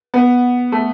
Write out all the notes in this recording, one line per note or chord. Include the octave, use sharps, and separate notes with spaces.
B3
A3